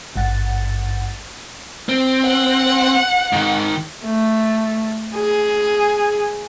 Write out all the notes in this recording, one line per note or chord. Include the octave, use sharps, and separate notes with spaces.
G#1 G2 F#5 A6
C4
F#5
G#2 D#3
A3
G#4